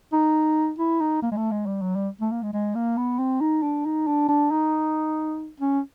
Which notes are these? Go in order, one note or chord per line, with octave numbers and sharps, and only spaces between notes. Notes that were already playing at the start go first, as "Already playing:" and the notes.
D#4
E4
D#4
A#3
G#3
A3
G#3
G3
F#3
G3
A3
A#3
G#3
G#3
A#3
B3
C4
D#4
D4
D#4
D4
D4
D#4
C#4